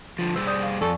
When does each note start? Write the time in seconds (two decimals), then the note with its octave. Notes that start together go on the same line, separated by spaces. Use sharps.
0.19 D3 F3 F4
0.36 G3 G#4 C5 E6
0.47 D5 D#6 G6
0.63 F5
0.81 F2 A4 D5 G#5 C#6